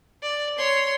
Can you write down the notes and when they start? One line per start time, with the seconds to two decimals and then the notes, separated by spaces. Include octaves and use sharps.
0.23 D5
0.58 C#5 C6